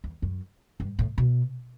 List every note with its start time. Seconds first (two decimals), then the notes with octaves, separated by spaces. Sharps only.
0.04 E2
0.22 F#2
0.80 G2
0.99 A2
1.18 B2